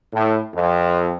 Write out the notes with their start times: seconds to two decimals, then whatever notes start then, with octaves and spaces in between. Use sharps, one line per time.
0.13 A2
0.54 F2